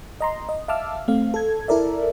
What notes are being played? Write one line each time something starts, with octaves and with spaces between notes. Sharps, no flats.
D#5 A#5 C6
D#5
E5 F5 A5 D6 E6 F6
A3 C4 F5
A4 G#6
E4 A4 A#4 D5 E5